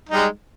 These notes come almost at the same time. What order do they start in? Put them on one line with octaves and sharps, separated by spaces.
D#4 G3 G#3